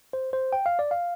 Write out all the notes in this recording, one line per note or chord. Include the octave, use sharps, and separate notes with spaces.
C5
C5
G5
F5
D5
F5